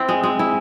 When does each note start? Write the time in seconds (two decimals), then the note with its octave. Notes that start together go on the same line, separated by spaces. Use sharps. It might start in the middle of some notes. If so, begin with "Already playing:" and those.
Already playing: C4 E4
0.09 G#3
0.24 G#3
0.39 E4